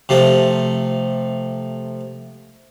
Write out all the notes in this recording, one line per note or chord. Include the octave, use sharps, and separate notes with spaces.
C3 F3 A3